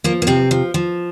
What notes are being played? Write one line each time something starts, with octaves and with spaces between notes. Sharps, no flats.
F3 A#3
A#3
C3 C4
F3
F3